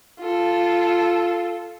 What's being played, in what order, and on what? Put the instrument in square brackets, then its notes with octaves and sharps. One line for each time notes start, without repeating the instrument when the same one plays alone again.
[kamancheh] F4 A4